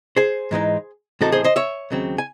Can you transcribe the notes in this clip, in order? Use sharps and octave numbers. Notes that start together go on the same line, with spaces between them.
G#4 C5
G#2 E3 G#3 D#4
A2 E3 C4 D#4 F#4 A4
G#4 C5
C5 D#5
C#5 E5
D#2 C#3 F#3 C4
G#5